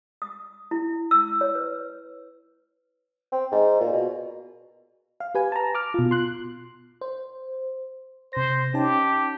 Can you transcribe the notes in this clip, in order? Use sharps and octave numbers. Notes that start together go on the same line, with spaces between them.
D#6
E4
E6
C#5
B4
C4
G#2
A#2
B2
F5
G4 B4 G#5
A5 A#5
D6 F6
B2 F4
C6 F#6
C5
C3 C5 A#6
C#4 D#4 G4 A5